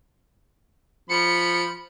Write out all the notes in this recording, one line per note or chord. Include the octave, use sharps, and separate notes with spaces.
F3 B5 C#7